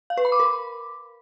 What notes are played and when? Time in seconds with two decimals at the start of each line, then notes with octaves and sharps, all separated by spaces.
0.10 F5
0.17 B4
0.25 B5
0.32 D6
0.40 A#4